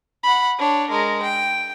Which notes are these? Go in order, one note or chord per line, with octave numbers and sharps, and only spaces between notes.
F#5 B5
D4 C#5
G#3 A#4
G5